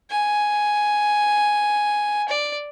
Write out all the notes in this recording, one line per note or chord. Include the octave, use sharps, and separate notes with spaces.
G#5
D5